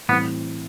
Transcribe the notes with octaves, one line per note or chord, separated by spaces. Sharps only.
A2 E3 G3 B3 C4